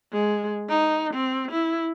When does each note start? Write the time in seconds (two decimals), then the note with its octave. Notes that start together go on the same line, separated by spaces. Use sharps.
0.13 G#3
0.70 D#4
1.13 C4
1.52 E4